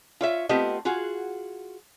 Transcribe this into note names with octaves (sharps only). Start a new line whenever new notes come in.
F4 C#5 E5
A3 B3 C4 F4 G4 D#5
F4 F#4 G#4